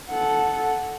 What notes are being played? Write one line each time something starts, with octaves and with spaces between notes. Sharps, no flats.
A4 F#5